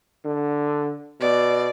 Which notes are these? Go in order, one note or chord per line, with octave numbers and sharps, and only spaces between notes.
D3
B2 D5